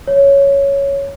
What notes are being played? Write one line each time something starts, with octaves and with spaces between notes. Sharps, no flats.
C#5